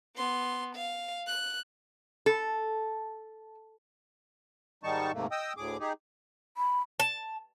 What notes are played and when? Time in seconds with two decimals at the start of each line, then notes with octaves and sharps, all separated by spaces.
0.16 B3 C6
0.76 F5
1.27 F#6
2.26 A4
4.83 G#2 D#3 G3 D#4 A5 C#6
5.14 D#2 G#2 C3 A3 A#3
5.31 D#5 G5 D#6 E6
5.57 D2 A2 G#4 D6
5.80 D#4 G4 G#4
6.57 B5
7.00 A5